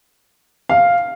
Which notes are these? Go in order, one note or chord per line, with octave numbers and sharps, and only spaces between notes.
F5